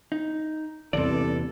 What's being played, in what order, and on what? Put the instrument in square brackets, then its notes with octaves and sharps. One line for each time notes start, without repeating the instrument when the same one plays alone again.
[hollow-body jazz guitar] D#4
[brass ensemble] A1 G2 A4 [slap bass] E2 C3 E3 [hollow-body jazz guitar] C4 D5